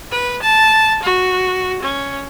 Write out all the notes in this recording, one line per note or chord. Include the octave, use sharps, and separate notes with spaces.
B4
A5
F#4
C#4